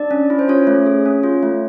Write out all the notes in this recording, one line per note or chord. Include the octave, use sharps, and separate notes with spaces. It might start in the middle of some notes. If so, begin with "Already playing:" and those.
Already playing: D4 D5
C#4
E4
C5
C#4 F4 C#5
A3
G#4
C#4
F4
A3